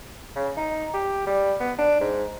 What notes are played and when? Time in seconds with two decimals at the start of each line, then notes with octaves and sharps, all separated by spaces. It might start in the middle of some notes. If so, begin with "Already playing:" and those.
0.35 C#3
0.57 D#4
0.94 G4
1.27 G3
1.60 B3
1.79 D4
2.00 G#2